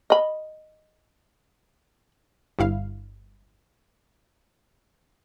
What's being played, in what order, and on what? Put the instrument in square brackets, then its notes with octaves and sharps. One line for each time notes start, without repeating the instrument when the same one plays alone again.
[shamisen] D#5 B5
[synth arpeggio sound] G1 G2 E4 F5